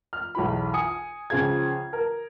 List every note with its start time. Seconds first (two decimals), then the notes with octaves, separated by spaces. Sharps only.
0.13 F6
0.35 B1 E2 E3 B5
0.74 G#5 D#6 C#7
1.30 C#2 C#3 F3 F4 G#4 G#6
1.93 A#4